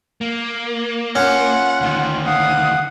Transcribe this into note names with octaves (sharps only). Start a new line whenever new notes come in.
A#3
C#4 F4 F#5
D2 D#3
F5 F#5 D#6